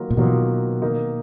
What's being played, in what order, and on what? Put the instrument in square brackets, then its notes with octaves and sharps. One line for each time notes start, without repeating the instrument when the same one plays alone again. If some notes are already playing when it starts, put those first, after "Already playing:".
Already playing: [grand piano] D#3 F#3 A#3 F4 A#4
[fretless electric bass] A#2
[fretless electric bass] B2 [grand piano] D#3 F#3 A#3 F4 A#4
[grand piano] D#3 A#3 D#4 A#4